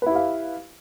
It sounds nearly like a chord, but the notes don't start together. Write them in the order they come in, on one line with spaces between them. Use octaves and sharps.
B4 E4 G4 F5